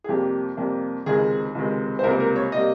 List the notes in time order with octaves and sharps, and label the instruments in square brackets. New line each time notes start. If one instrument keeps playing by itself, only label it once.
[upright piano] G#4
F2 C3 G3 A#3 G4
F2 C3 G3 A#3
C#2 C3 D#3 G#3 G#4
C#2 C3 D#3 G#3
C5
C#2 C3 G3 A#3 A#4
A#4
C#5
C3 G3 A#3 D#5